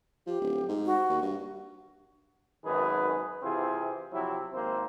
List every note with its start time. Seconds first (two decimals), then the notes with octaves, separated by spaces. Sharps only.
0.27 F3 G4
0.41 D1
0.69 G#2
0.86 F#4
1.09 D#2
1.22 G2
2.64 G#1 F#2 D#3 G#4 B4
3.43 C3 E3 C4 E4 F4 G#4
4.13 C3 F3 F#3 C4 E4
4.52 G#1 A#3 C4 C5